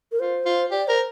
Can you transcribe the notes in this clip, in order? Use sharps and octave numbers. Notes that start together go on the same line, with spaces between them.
A#4
F4 C5
F4
G4 D5
A#4 C5